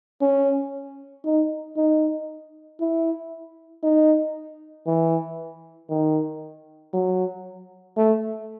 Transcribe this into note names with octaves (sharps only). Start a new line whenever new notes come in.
C#4
D#4
D#4
E4
D#4
E3
D#3
F#3
A3